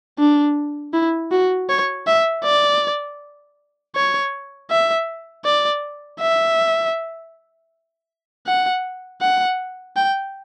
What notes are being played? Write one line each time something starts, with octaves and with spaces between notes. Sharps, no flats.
D4
E4
F#4
C#5
E5
D5
C#5
E5
D5
E5
F#5
F#5
G5